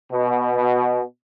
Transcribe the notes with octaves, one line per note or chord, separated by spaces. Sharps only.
B2